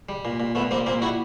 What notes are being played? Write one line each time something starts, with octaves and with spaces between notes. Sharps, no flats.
G3
A#2
A#2
A#2 A3 B3
G3 A#3 C4
A#2 A#3 C4
G3 E4 F#4